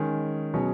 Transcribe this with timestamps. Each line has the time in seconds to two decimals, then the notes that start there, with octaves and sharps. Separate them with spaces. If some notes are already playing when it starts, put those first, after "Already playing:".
Already playing: D#3 G#3 C#4
0.54 B2 F#3 C#4 G#4